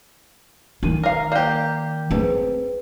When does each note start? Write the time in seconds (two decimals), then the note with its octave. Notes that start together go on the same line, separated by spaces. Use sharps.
0.83 D#3 D4 D#7
1.03 A#4 F5
1.32 A#3 G4 D5 G6
2.11 C4 G#4 B4